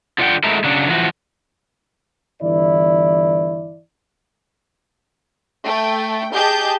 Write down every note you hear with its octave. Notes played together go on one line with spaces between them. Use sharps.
D3 F4 D5 F#5 G5
F#3 G#3 A3 E4 A4 A#4
C#3 F#3 D4
E3 F3 F#4
G1 E3 E4 D5
A3 G5
G4 G#4 D#5 A5 G6